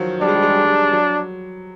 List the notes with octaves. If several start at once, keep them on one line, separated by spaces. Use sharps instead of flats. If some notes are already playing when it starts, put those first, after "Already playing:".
Already playing: D#3 F3 F#3
G3 D4
G#3
G3
G#3
G3
G#3
G3
F#3